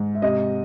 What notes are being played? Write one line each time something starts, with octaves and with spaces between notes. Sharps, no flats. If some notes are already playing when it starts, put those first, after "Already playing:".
Already playing: G#2
E5
C3 D#5